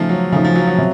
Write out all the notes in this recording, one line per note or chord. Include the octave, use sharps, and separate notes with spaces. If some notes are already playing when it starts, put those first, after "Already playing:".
Already playing: C#3 F3 A3 D#4
F#3
C#3 F3 A3 D#4
F3
F#3
F#3
C3